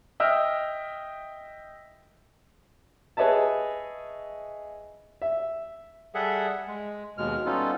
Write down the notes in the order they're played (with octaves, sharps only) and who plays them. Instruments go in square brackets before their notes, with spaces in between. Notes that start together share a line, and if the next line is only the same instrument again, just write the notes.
[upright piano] D#5 E5 G5 E6 F6
[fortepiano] G#4 B4 C#5 D#5 E5 A5
E5
[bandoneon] G3 G#4 A4 E5 F#5
G#3
D#2 B2 G#3 F6
G3 B3 C#4 D#4 F4 A4